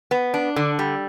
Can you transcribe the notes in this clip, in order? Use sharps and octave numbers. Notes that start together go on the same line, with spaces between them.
B3
D4
D3
G3